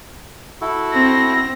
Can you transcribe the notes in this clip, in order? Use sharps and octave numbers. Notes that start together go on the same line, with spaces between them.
E4 F#4 A4
C4 A#6